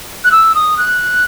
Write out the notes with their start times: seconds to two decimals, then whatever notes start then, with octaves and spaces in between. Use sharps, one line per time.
0.24 F#6
0.32 E6
0.55 D#6
0.78 F#6